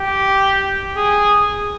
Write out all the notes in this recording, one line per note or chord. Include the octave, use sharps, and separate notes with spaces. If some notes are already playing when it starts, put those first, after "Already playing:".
Already playing: G4
G#4